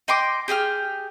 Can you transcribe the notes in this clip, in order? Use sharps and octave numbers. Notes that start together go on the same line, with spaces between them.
D#5 G5 C6 D6
G4 G#4 G5 F6